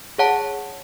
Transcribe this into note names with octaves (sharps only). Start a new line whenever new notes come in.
G#4 C#5 F#5 A5